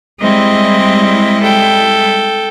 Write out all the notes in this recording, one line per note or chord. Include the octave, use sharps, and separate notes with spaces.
G3 G#3 C4 E4 D#5
A4 G5